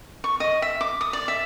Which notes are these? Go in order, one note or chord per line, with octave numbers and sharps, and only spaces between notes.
C#6
D#5
E5
D6
D#6
D5
E5